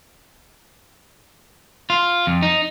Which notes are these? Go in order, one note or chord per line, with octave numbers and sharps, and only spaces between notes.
F4
F2
D#4